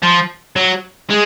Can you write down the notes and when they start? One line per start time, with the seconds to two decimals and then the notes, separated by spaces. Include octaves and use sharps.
0.03 F3
0.56 F#3
1.10 G#3